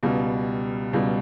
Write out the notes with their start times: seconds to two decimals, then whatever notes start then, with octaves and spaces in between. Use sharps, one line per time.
0.03 C#2 B2 G3
0.93 C#2 B2 G3